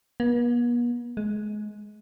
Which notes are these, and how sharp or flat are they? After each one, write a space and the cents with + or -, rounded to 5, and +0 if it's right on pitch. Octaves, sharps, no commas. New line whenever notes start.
B3 -45
G#3 +25